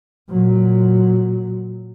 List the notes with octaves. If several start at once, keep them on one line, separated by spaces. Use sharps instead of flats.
A#2 F#3